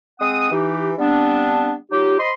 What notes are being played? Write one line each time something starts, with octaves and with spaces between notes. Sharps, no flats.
G#3 C4 F#5 D#6
E3 D#4 G4
G3 B3 C4 D4
F#3 D#4 F4 G4
C5 D#5 B5 C6